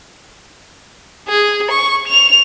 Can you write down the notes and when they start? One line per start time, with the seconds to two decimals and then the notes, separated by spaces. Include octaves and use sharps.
1.28 G#4
1.71 C#6
2.08 F7